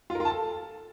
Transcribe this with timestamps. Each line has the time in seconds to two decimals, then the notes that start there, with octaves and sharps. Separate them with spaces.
0.10 F4
0.15 A#4
0.20 F4
0.25 A5
0.30 A4